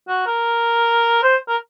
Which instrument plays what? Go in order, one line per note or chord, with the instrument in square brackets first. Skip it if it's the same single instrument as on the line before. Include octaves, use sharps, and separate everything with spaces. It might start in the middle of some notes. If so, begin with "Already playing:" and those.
[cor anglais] F#4
A#4
C5
A#4